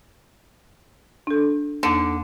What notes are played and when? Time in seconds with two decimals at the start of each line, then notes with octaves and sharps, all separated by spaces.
1.27 D4 A4
1.83 E2 D3 A#3